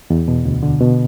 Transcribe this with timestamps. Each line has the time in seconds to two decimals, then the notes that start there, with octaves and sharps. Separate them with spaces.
0.10 E2
0.28 B2
0.45 D2
0.63 D3
0.81 B2